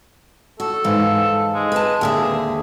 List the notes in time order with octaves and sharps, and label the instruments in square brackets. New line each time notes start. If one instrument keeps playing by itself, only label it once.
[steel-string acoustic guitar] F#4 [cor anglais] A4
[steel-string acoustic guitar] G#2 E3 F5
[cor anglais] G#3
[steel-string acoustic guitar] B4 A5
[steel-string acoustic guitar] D#2 D3 E5 [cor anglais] G#4